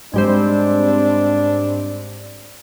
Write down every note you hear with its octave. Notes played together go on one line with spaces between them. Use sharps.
G#2 G3 C4 D4